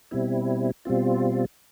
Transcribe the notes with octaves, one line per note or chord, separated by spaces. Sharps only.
B2 G3 C4 E4
B2 G3 C4 F4